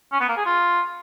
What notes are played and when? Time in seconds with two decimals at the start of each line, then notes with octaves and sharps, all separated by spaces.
0.12 C#4
0.21 B3
0.29 A#3
0.37 G#4
0.45 F4